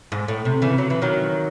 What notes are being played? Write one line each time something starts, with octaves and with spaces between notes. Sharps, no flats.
G#2
A2
C3
C#3 E3
F#3
E3
D#3 F#3